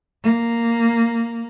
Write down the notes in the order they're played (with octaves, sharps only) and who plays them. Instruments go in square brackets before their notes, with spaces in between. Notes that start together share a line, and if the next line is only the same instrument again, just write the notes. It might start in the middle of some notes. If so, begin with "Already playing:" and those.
[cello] A#3